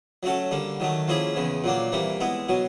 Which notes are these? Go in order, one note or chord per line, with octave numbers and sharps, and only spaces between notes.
F#3 A3 C#4 F#4 A4
D3 G3 A#3
D#3 F#3 A3
F3 A#3 C#4 E4 G#4
E2 C#3 E3
A#2 F#3 A#3 D4
C3 E3 G3 A#3
G#3 B3 E4
B2 F#3